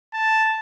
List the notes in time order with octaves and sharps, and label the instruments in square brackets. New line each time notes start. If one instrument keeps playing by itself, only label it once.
[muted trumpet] A5